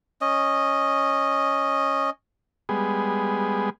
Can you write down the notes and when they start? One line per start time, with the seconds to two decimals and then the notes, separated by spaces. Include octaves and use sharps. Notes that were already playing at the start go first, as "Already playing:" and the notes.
0.21 C#4 D#5
2.69 G3 G#3 B3 G#4